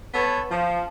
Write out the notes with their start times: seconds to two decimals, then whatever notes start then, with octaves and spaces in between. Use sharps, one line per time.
0.14 B3 A4 B4 C#5
0.51 F3